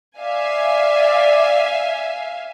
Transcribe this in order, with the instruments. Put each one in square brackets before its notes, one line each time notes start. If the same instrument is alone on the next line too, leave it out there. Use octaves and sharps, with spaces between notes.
[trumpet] D5 [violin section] E5 F5 G#5